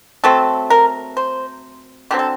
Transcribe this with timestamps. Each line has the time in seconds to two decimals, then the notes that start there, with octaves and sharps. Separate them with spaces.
0.24 F#3 A3 C4 A4
0.70 A#4
1.17 C5
2.11 D3 F#3 C4 G4
2.19 A4